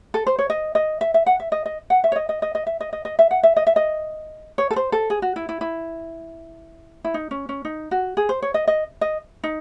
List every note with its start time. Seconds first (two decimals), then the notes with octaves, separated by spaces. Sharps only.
0.14 A4
0.27 C5
0.39 C#5
0.50 D#5
0.75 D#5
1.01 E5
1.14 E5
1.26 F#5
1.40 E5
1.52 D#5
1.66 D#5
1.90 F#5
2.04 E5
2.12 C#5
2.16 D#5
2.29 D#5
2.42 D#5
2.55 D#5
2.67 E5
2.80 D#5
2.93 D#5
3.05 D#5
3.19 E5
3.31 F#5
3.43 E5
3.56 D#5
3.67 E5
3.76 D#5
4.58 C#5
4.71 A4
4.76 C5
4.92 A4
5.10 G#4
5.22 F#4
5.36 E4
5.49 E4
5.61 E4
7.05 E4
7.14 D#4
7.31 C#4
7.49 C#4
7.65 D#4
7.91 F#4
8.17 G#4
8.29 C5
8.42 C#5
8.54 D#5
8.67 D#5
9.01 D#5
9.44 D#4